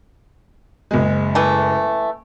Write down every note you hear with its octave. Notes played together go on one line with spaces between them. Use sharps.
F#1 G#3
E3 A3